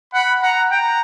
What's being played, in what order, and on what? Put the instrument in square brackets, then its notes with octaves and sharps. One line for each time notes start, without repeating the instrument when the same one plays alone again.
[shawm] F#5 [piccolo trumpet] B5
[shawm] F#5 [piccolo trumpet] A#5
[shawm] G5 [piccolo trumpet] A#5